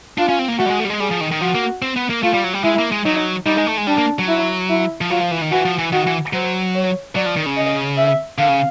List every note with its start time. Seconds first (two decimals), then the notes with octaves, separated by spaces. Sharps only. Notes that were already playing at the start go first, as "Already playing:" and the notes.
0.18 D4 F4
0.29 C#4
0.39 C4
0.48 A#3
0.59 A3 F#4
0.66 G3
0.70 G#3
0.80 A3
0.85 G3
0.90 G#3
1.00 G3 G#4
1.11 F3
1.21 D#3
1.31 D#3
1.41 F3 F#4
1.55 A#3
1.82 C4
1.96 B3
2.10 A#3
2.23 A3 F4
2.34 G3
2.44 F#3
2.54 G3
2.64 G#3 E4
2.79 A#3
2.92 G#3
3.05 F#3 D#4
3.46 G3 D#4
3.57 G#3
3.67 A3
3.77 G#3
3.87 G3 D4
3.98 A#3
4.19 F#3
4.28 E4
4.70 E4
5.01 F3
5.10 F#3 F4
5.21 F3
5.31 E3
5.42 D#3
5.51 E3 F#4
5.65 F3
5.78 E3
5.92 D#3 F#4
6.07 E3
6.33 F#3 C5
6.75 C#5
7.15 F#3 D5
7.26 F3
7.36 D#3
7.46 C#3
7.57 D#5
7.98 E5
8.38 D3 F5
8.49 C#3